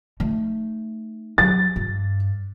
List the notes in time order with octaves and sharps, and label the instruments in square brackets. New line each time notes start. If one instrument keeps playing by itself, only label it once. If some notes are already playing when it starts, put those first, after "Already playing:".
[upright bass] A3 D#4
[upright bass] F#3 [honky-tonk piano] A6
[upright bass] G2